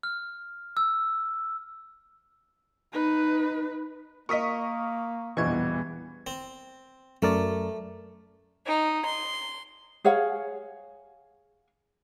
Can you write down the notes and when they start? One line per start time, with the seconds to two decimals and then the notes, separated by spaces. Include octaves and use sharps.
0.03 F6
0.77 E6
2.93 D#4 B4
4.29 A#3 A#4 D#5 C#6 D#6 B6
5.37 A#1 E2 B2 E3 G3 B3 C#6 G#6
6.27 C4
7.22 F#2 A3 A#4 D5
8.67 D#4
9.06 C6
10.04 G#4 C#5 F5 F#5